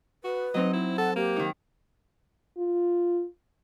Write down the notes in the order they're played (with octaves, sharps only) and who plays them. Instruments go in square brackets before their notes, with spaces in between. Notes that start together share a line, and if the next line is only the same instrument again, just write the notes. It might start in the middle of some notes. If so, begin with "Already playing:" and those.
[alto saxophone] F#4 [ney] B4
[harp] F#3 C4 D#4 [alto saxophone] D#5
[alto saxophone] E4
[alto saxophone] A4 [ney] F#5
[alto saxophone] A#3 [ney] G4
[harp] D#3 D#4
[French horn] F4